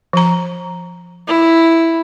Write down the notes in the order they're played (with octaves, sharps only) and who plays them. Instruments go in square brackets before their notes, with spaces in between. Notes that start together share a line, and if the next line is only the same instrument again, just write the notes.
[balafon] F3 A#5
[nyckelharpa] E4